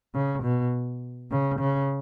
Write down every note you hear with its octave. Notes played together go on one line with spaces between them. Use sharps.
C#3
B2
C#3
C#3